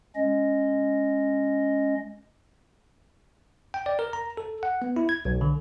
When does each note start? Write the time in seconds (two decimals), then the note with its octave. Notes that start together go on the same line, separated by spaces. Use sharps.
0.15 G#3 C#4 D#5
3.74 G5
3.86 D5
3.99 A#4
4.13 A#5
4.37 A4
4.63 F#5
4.82 B3
4.96 E4
5.09 G#6
5.25 B1
5.41 D3